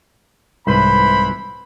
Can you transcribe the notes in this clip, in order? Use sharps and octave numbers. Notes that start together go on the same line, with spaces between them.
C2 G#2 E3 B4 C5 B5